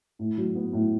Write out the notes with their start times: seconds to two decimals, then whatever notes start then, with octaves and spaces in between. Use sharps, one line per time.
0.19 A2
0.38 F#3
0.55 B3
0.73 A2